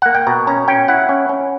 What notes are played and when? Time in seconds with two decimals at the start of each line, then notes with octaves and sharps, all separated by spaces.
0.02 A#3 F#5
0.15 G5
0.27 B2 A#5
0.47 C#4 A#5
0.68 C#4 G5
0.88 E4 F#5
1.09 C#4
1.29 C#4